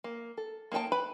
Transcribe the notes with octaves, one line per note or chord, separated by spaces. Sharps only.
A#3
A4
A#3 D#4 A#4 G5 A5
B4 B5